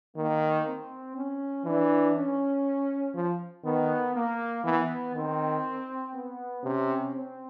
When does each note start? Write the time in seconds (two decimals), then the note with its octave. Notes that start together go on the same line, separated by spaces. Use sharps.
0.16 D#3 A#3
0.65 C4
1.15 C#4
1.65 E3 D4
2.15 C#4
3.15 F3
3.64 D#3 B3
4.14 A#3
4.64 E3 B3
5.14 D#3 C4
6.14 B3
6.63 C3 C#4
7.13 C4